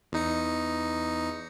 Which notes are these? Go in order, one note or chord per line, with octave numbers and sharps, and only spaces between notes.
E2 D#4 C#7